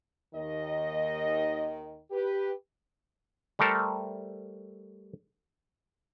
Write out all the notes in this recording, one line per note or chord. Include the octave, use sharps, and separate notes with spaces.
D#2 D#3 D#5
G4 B4
G3 A3 A4 A#4 C5